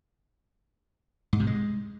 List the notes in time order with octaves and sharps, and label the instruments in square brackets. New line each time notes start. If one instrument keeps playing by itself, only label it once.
[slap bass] G#2
C3
G#3